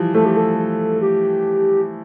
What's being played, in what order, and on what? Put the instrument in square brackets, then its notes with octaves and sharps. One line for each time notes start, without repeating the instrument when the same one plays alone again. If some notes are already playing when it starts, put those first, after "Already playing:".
Already playing: [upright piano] E3 F3 G3
[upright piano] F3 A3 [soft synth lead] A4
[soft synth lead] G4
A4
A4
G4